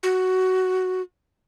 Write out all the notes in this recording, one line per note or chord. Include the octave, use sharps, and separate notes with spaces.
F#4